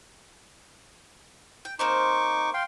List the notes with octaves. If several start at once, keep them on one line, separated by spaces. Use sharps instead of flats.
G5
A#3 C4 D#4 C5 C#6 D6
F5 G5 C6